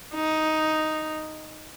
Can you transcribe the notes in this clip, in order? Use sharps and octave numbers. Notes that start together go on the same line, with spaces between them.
D#4